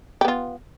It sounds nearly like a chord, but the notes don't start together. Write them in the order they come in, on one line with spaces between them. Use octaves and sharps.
G4 B3 F4